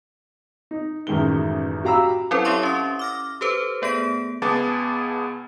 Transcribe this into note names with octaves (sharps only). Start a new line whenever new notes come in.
D#4
A1 F#2 D#3 G#3 G7
F#4 G4 F5 A#5 B5 E6
F#3 C4 C#4 E4 A4 C5
E4 G4 C#5 E5 C6 C#6
C#4 D#6
D6 F6 A#6
G4 A4 B4 C5
A3 B3 G#4 A#6 D7
C#2 B3 G#4 A5 D6 A6